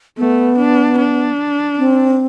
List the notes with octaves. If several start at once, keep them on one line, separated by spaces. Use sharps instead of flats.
A3 B3
D4
D4
C4